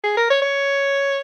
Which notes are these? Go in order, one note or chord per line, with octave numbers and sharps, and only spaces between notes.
G#4
A#4
C#5
C#5